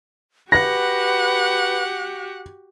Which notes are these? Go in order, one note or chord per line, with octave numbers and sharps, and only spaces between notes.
F#4 G4 B4 F#5 A#6